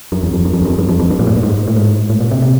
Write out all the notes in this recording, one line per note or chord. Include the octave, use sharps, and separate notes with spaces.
F#2
E2
F2
F#2
F2
E2
F#2
F2
G2
F2
F2
G2
A#2
A2
G2
G#2
A2
G#2
A2
A#2
C3
C3